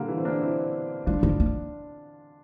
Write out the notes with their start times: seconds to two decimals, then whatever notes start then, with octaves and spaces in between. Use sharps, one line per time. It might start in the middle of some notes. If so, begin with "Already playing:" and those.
Already playing: D3 G3 A#3
0.08 E3
0.18 C4
0.25 A#3 D4
0.41 C4 E4
1.06 G3 D4 F4
1.23 F3
1.40 F3